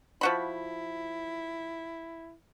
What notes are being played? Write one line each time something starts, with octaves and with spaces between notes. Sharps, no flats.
F3 E4 F#4 B5